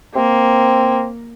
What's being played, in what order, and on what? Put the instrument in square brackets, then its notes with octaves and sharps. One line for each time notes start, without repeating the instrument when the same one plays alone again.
[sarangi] A#3 [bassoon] C4